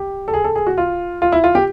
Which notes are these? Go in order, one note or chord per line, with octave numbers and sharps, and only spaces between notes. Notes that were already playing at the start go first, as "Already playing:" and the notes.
Already playing: G4
A4
G#4
A4
G#4
F#4
F4
F4
E4
F4
G4